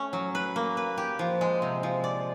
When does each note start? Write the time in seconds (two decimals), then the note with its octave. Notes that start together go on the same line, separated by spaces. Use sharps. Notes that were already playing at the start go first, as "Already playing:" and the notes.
Already playing: A3 C#4
0.13 F#3
0.35 B4
0.56 A#3
0.77 B4
0.98 G4
1.19 F3
1.41 G#3
1.62 C3
1.83 F3
2.04 D5